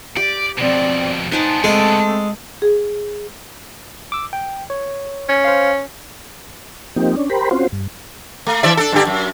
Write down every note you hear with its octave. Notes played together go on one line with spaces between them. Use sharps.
G4 D5
F2 B2 C4 D5
B3 D4 D#4 C5 G#5 A5
G#3 A3 C4 A4
G#4
D6 E6
G5
C#5
C#4
C5 F5
F3 A#3 C4 D#4 G4
C#4 D4
G4 A#4 C5 B5
C4 C#4 F4 F#4 C5
G2
A3
E3 D5 E5
D4 A4
G2 D3 G4
F#2